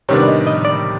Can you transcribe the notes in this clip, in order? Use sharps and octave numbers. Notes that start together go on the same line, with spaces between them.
C3 D#3 G3 B3 D4 C#5
D5
D#5
D#5
D5